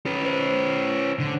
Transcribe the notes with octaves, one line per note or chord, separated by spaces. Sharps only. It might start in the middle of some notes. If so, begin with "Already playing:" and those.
C#4 B4
C5
D3